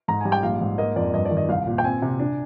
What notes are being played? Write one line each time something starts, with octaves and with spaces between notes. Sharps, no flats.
G#2 A#5
G3 G#5
G5
A#1 F5
G#2
A#3 D#5
F2 D5
G2 D#5
D5
D#3
D#5
C2 F5
A#2
G5
C4 G#5
C3
D4